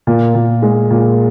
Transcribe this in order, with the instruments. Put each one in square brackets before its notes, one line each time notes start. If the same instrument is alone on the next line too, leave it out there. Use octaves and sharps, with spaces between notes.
[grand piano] A#2
A#2
G#3
A#2